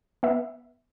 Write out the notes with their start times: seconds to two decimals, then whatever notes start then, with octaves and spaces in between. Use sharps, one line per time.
0.23 B3 E5